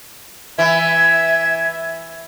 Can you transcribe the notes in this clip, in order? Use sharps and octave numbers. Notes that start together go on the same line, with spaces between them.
E3 E5 G#6